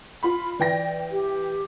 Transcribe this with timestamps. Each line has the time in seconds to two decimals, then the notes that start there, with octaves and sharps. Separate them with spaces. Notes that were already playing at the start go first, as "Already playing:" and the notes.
0.23 F4 B5
0.59 E3 D5 G5 A#6
1.12 G4